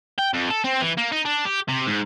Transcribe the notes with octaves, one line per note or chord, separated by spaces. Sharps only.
G5
F2
A4
C4
E3
A#3
D#4
D4
G4
C3
G#2